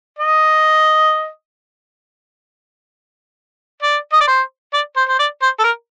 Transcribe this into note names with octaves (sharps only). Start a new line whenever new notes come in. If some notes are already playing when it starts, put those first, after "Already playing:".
D#5
D5
D#5
D5
C5
D5
C5
C5
D5
C5
A4
A#4